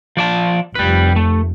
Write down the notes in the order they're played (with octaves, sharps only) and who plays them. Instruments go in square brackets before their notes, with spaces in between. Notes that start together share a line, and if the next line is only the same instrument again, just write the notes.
[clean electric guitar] F3 D5 A5
[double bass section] F1 [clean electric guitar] G3 B4
[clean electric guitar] A3